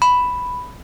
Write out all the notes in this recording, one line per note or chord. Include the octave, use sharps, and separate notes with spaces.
B5